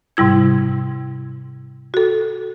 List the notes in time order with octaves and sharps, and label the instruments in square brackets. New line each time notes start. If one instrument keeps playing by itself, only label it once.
[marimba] G#2 C3 G3 E4 G#6
F#4 A4